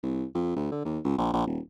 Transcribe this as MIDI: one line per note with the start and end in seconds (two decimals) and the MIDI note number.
0.03 0.25 36
0.35 0.54 41
0.56 0.72 38
0.72 0.84 50
0.85 0.99 39
1.04 1.15 37
1.18 1.31 34
1.33 1.45 34
1.46 1.59 27